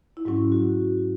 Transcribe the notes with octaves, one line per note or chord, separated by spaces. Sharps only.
E4
G#2 F#3 C#4 F#4
F#4